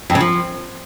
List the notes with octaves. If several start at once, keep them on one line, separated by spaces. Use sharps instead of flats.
F2
C#3
F3